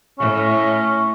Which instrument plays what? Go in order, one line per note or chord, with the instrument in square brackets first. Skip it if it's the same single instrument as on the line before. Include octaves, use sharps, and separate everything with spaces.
[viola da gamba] A2 [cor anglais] C#4